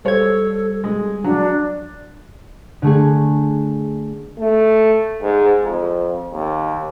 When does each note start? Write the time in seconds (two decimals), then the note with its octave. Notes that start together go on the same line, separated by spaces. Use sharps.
0.05 G3 A4 C5 C#5 G#6
0.84 G#3
1.24 F#3 D4
2.82 D3 A3 G#4
4.39 A3
5.22 G#2
5.63 F2
6.33 D#2